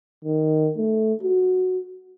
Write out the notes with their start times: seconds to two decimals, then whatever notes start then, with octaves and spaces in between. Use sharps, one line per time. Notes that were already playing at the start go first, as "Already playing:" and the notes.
0.24 D#3
0.78 A3
1.23 F#4